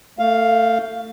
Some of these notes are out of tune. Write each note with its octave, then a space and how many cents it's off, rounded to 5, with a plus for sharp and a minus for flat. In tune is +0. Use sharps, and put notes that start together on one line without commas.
A3 +25 F5 +0